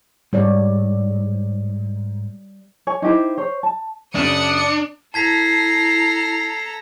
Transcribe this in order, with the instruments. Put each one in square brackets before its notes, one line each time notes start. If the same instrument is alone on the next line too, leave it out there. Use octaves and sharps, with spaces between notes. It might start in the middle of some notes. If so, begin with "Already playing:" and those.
[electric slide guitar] G#2 [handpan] G3 C#5 D5
[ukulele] C#5 G#5
D#4 E4 G4 C5
C5 C#5
A5
[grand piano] F#2 C#3 [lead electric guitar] D4 [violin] D#6 C#7
[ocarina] E4 [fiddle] A4 A#5 [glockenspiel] A5 G#6 B6 [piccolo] C7